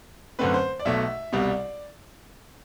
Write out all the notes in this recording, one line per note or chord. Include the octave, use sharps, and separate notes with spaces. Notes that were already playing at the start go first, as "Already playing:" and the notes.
F#2 D3 A3 C4 B4
C5
D5
B1 B2 A3 E5
C2 B2 G3 D5